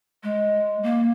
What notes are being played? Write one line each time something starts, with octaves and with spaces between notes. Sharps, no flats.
G#3
A#3